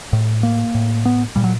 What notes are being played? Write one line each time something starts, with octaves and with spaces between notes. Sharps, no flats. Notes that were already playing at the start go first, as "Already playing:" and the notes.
A2
A#3
A2
B3
A#2 G3
F#3